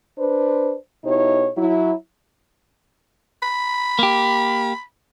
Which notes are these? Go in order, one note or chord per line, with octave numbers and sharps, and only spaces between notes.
D4 B4 C5
B2 D#4 E4 G4 C#5
F#3 E4
B5
A#3 G4